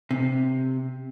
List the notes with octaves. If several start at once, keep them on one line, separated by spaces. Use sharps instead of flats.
C3